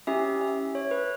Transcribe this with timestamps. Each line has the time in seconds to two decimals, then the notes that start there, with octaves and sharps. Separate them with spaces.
0.07 C#4 E4 G4 E5
0.41 E5
0.75 C#5
0.91 B4